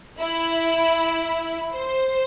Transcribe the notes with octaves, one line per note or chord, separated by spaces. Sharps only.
E4
C5